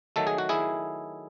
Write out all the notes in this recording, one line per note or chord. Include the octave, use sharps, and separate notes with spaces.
D#3 F#3 A3 A4
G#4
F#4
E4 G#4